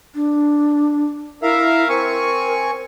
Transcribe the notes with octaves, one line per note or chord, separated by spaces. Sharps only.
D4
E4 A#4 E5 F5
C4 A#4 G#5 C#6